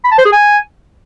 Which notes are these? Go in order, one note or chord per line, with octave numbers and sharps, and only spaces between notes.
B5
A5
C5
G#4
G#5